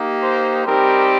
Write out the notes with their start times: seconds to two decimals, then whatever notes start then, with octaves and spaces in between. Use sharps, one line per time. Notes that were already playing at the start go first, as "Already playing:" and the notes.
Already playing: A#3 D#4 G4
0.21 C5
0.65 G3 C4 D#4 G4 A#4